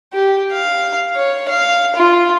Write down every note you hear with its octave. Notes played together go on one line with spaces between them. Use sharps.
G4
F5
C#5
F5
F4